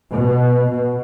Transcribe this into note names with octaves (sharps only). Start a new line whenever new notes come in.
B2
B2